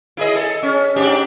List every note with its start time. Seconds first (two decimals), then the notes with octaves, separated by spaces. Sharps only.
0.17 E4 G#4 D#5
0.35 A4
0.63 C#4
0.96 G#2 D4 G4